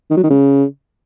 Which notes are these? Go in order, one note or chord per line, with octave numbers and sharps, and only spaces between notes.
D#3
F#3
D#3
C#3